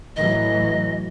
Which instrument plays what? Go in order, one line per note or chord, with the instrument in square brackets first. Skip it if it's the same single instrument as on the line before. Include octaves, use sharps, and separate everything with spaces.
[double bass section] A2 E3 F#3 [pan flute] D#5